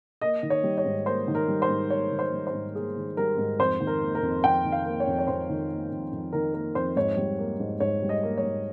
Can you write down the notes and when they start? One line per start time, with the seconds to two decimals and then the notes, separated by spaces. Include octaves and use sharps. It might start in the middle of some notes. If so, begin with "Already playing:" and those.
0.22 A#3 D#5
0.43 D#3
0.50 C#5
0.64 G3
0.78 C#5
0.85 G#2
1.06 A#3 C5
1.28 D#3
1.35 A#4
1.48 G3
1.62 C5
1.69 G#2
1.90 A#3 C#5
2.12 D#3
2.19 C5
2.32 G3
2.47 C5
2.53 G#2
2.75 A#3 G#4
2.96 D#3
3.17 G3 A#4
3.38 G#2
3.59 F2 C5
3.80 D#3
3.87 A#4
4.02 A#3
4.15 A#4
4.22 F2
4.44 F2 G5
4.65 D#3
4.72 F5
4.86 A#3
5.00 C#5
5.07 F2
5.19 C#5
5.27 F2 C5
5.49 D#3
5.70 A#3
5.91 F2
6.12 F2
6.33 D#3 A#4
6.54 A#3 A#4
6.75 F2 C5
6.96 G#2 C#5
7.17 G3
7.39 A#3
7.60 G#2
7.80 G#2 C#5
8.02 G3
8.09 D#5
8.23 A#3
8.37 C#5
8.43 G#2